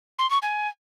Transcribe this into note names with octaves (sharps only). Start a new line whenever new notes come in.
C6
C#6
G#5